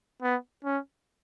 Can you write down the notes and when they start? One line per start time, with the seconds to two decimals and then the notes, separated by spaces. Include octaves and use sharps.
0.22 B3
0.65 C#4